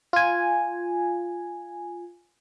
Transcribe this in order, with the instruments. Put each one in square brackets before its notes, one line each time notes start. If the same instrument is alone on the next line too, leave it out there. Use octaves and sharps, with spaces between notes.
[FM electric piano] F4 G#5